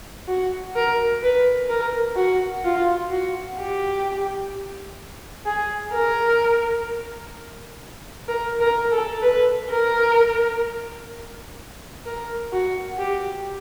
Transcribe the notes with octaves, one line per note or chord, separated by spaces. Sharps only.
F#4
A#4
B4
A#4
F#4
F4
F#4
G4
G#4
A#4
A#4
A#4
A4
B4
A#4
A#4
F#4
G4